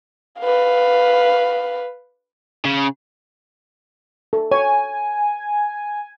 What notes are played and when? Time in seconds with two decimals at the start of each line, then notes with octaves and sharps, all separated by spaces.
0.40 B4 F5
2.65 C#3
4.33 A4
4.51 C#5 G#5